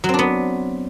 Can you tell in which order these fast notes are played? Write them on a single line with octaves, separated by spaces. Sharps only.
F#3 C4 D4 B3